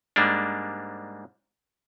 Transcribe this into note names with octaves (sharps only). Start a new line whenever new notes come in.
G#2 G3 G#3 A#3 D4